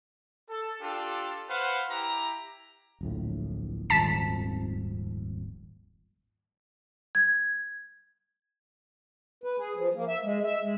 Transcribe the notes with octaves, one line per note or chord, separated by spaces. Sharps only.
A4
D4 F4 G4 A4
B4 C5 F5 F#5
E4 G4 A#5
D1 A#1 A2
D#1 G#1 F2 A5 B6
G#6
B4
G#4
F3
A#3
E5
G#3
E5
G#3